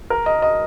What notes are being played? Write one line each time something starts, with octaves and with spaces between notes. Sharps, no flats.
A#4
D#5
D#5